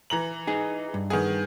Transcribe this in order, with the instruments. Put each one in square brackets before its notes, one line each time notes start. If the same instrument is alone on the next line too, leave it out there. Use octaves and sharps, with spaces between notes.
[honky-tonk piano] E3 A#5 F#7
[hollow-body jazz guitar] D#4 G#4
G2
[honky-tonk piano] D#3 B3 G#4